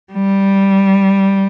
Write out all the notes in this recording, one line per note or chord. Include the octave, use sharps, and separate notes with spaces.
G3